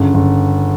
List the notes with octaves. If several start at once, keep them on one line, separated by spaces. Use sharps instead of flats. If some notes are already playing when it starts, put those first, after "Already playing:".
Already playing: G1 C#3
G1